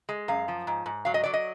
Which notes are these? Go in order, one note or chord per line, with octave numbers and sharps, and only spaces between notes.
G#3
F#2 F5
F3
G#2
G#2
F#3 F5
D#5
F#3 D5
D#5